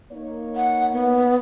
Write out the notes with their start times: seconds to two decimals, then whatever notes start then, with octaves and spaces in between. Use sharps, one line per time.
0.12 A#3 D#4 C#5
0.56 F#5
0.93 B3